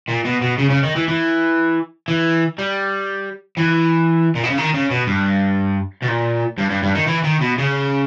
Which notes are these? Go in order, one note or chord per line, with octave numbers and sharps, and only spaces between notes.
A#2
B2
B2
C#3
C#3
D#3
E3
E3
E3
G3
E3
A#2
B2
C#3
D#3
C#3
B2
G2
B2
A#2
G2
G2
G2
D#3
E3
D#3
B2
C#3